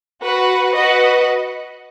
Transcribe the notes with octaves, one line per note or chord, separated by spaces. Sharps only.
F#4 B4 F#5
F#4 B4 D#5 F#5